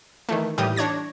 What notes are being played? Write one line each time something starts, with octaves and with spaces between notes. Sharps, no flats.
D#3 E3 A3
D#2 A2 E3 G3 G4 D#6
D4 C#5 G#6 A#6